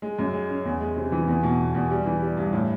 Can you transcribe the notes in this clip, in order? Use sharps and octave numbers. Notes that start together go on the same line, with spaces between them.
G#3
F#2
G#3
C#4
E2
G#3
C3
E3
E2
B2
E2
E2
G3
E3
G3
G2
A2